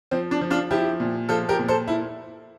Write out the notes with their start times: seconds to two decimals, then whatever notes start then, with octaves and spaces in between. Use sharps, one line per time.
0.11 F3 C4
0.31 D4
0.41 F3
0.50 D4 F4
0.71 F3 E4 G4
1.00 A#2
1.29 F3 F4 A4
1.49 G4 A#4
1.59 A#2
1.68 A4 C5
1.88 E4